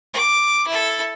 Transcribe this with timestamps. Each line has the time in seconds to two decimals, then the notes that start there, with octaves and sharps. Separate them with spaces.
0.14 D6
0.67 E4 A4